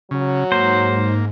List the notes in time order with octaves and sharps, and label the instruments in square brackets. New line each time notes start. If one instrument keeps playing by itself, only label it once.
[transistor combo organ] C#3 [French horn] F#3
[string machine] G#2 [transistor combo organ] A#3 [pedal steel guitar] C5